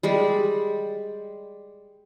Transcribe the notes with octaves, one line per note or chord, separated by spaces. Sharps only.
G3 G#3 D5